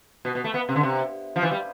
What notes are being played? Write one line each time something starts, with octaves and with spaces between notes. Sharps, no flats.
B2
B2
A3
B3
C3
D3
C3
F3
E3
G3